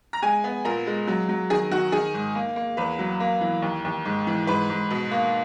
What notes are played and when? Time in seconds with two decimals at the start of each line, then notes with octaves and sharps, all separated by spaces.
0.13 A#5
0.22 G#3 G#5
0.44 B3
0.65 A#2 A#4
0.87 G#3
1.07 F#3
1.29 F#3
1.50 D#3 G#4
1.71 D#3 F#4
1.92 D#3 G#4
2.14 G#2
2.35 A#3
2.56 A#3
2.77 E2 B4
2.99 F#3
3.20 A#3
3.41 E3
3.62 D#2
3.85 D#2
4.05 G#2
4.27 E3
4.47 G#2 B4
4.70 G#2
4.90 B2
5.11 A#3